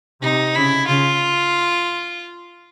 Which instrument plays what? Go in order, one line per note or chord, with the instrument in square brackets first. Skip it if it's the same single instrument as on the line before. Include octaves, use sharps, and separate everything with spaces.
[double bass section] C3 [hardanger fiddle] D#4
[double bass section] C#3 [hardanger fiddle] E4
[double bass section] C#3 [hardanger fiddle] F4